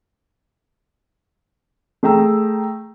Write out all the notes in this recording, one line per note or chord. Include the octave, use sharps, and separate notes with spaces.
A3 G#4 G5 A#5 E6